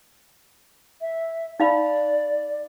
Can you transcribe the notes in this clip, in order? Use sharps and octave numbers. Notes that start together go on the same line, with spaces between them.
E5
D#4 D5 F5 B5